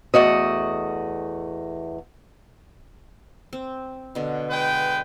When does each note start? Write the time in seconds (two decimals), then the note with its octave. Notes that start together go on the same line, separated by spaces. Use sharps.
0.14 E2 A3 F#4 D#5
3.53 C4
4.15 B2 D3
4.50 G#3 B4 G5